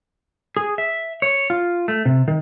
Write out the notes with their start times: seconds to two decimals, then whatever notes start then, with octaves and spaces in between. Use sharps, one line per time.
0.57 G#4
0.78 E5
1.22 C#5
1.50 F4
1.88 A3
2.06 C3
2.28 D#3